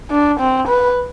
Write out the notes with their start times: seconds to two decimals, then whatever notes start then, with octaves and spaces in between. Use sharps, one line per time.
0.11 D4
0.40 C4
0.68 B4